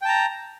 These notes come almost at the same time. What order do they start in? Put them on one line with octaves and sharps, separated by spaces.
G5 A5 A#5